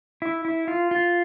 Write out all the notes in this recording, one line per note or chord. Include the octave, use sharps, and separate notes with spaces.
E4
E4
F4
F4